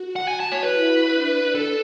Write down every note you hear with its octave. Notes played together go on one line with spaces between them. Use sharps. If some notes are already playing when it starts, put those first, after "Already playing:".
Already playing: F#4
F#5
G#5
A5
C#5
E4 B4
D4
A4